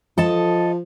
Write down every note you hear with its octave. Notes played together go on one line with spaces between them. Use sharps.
F3 A4 D#5 A5